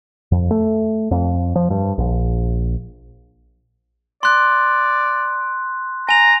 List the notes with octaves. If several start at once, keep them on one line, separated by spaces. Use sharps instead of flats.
F2
A3
F2
F3
G2
A#1
D5 C6 F#6
G#5 A#5 F7